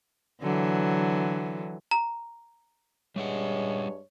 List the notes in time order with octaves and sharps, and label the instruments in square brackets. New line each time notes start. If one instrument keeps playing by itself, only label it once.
[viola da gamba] D3 E3 F#3
[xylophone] A#5
[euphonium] G2 [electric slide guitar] G3 E5 F#5 [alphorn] G#3 [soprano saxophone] C#5